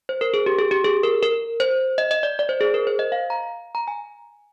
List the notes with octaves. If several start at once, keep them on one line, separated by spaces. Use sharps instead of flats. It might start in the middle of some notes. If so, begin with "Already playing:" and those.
C5
A#4
G#4
G4
G#4
G4
G#4
A#4
A#4
C5
D#5
D#5
D5
D5
C5
G#4
A#4
C5
D#5
F5
A#5
A#5
G#5